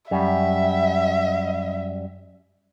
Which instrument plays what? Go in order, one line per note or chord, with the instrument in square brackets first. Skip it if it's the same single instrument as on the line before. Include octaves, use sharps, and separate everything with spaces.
[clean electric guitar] F#2 G3 [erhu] E5